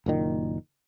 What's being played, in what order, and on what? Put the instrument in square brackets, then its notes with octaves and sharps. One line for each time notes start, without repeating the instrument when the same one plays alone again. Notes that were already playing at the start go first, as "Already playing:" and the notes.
[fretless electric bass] F#1 A#2 D#3